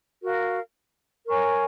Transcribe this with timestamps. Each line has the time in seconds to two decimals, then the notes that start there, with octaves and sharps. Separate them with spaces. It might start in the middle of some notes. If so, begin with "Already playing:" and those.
0.23 F#4 A#4 F5
1.28 A#4 C#5 G#5 C#6